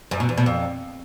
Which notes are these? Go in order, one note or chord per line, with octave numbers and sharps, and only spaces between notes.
F#2
B2
E2
B2
F2